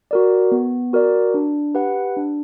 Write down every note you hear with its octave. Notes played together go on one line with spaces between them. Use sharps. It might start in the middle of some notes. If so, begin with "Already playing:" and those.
F#4 A#4 D5
B3
F#4 A#4 D5
D4
G4 B4 F#5
D4